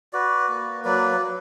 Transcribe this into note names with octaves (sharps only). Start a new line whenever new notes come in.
F#4 B4 D5
A#3
F#3 B4 D5
F#3